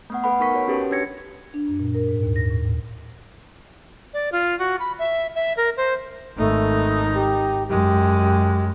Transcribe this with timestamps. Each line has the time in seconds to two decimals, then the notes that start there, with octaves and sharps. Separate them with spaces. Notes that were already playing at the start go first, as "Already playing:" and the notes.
0.10 A3 B3 F#5
0.24 A4 B4 F#5 B5
0.40 B3 D#4 A#4 B5 C#6 B6
0.54 F#4 C#5
0.68 C#4 F#4 G4 A4 B4
0.91 D4 A4 C#5 G#6 A#6 C#7
1.54 D4
1.68 F#2
1.80 A#2
1.95 A#4
2.09 G#2
2.23 D#2
2.36 A#6
2.50 A2
2.65 D#2
4.14 D5
4.32 F4
4.59 F#4
4.80 B5
4.99 E5
5.35 E5
5.57 A#4
5.77 C5
6.37 G#1 A3 D#4
7.14 G4
7.68 F#2 G#3 G4